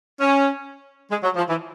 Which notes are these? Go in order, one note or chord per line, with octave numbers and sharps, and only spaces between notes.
C#4
G#3
F#3
F3
E3